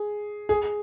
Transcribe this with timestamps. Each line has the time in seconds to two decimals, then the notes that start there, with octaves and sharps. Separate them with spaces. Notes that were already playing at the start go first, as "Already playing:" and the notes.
Already playing: G#4
0.49 G#4